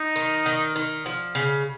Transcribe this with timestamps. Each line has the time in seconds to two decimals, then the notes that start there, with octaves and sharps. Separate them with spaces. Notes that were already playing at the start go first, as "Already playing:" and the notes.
Already playing: D#4
0.16 D#3
0.46 D#3
0.76 D#3
1.06 F3
1.35 C#3